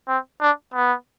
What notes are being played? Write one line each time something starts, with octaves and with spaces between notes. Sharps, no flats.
C4
D4
B3